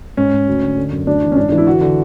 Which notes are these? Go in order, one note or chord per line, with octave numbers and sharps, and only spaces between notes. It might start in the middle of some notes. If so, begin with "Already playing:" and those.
G#2 C#4
G#2
D2
D3
D3
F#2
D2 D4
E3
C#4
G#2 D4
E3 D4
E4
D3 F#4
D3